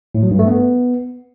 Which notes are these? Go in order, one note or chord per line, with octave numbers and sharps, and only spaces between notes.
A2
F#3
G2
A3
B3